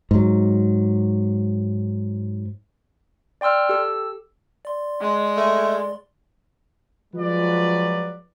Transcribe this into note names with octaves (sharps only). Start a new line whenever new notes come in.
G#2 F#3
D5 G5 C6 E6 F6
G4 A4 E6
D5 C6
G#3
A3
F3 F#3 G#3 F4 B4 D5